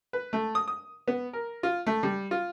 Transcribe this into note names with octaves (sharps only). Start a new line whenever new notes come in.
B4
A3
D#6
D#6
B3
A#4
F4
A3
G3
F4